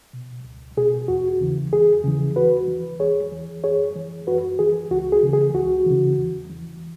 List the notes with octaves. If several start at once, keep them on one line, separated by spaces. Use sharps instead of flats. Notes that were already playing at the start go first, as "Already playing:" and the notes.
B2
C#2
B2 G#4
E2 F#4
C#3 E3
E2 G#4
C#3 E3
E2 F#4 B4
E3
E2 G#4 C#5
E3
F#2 G#4 C#5
E3
F#2 F#4 B4
E3 G#4
C#2 F#4
G#4
C#3 E3
G#4
C#2 F#4
C#3 E3
E2
E3